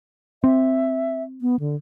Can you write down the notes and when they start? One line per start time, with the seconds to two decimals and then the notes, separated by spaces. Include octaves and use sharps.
0.44 C4 E5
1.41 B3
1.60 D3